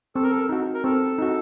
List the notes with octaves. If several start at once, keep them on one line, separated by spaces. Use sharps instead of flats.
C4 A4
A#4
A4
D#4 F#4
A#4
C4 A4
D#4 F#4